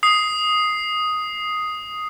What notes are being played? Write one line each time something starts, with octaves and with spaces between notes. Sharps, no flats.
D#6 C7